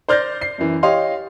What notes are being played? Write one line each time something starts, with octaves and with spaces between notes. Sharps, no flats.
C5 D5 F6 G6 A6 A#6
C7
F#2 E3
G4 C#5 D#5 F5 C6